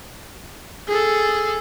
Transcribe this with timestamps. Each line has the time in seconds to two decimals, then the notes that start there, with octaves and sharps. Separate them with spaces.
0.88 G#4 A4